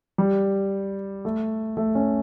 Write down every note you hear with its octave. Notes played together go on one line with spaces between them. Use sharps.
G3
A3
A3
C#4